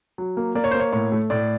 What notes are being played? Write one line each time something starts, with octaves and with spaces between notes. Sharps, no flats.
F#3
A#3
A#3 D5
C#5
C5
A#3
C#5
A2 C#5
A3
A2 D5